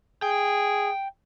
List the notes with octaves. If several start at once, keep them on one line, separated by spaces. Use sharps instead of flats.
G#4 G5